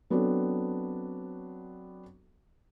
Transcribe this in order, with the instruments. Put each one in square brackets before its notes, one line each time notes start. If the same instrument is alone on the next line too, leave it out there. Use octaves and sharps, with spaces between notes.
[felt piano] F#3 B3 C4 D4 F#4 A4